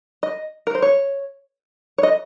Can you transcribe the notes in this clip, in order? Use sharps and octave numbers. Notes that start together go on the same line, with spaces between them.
D#5
A#4
C5
C#5
C#5
D#5